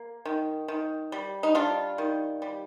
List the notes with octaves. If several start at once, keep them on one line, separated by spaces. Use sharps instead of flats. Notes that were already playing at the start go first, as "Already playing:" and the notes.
Already playing: A#3
D#3
D#3
G3
D#4
G3 D4 F4
D#3
G3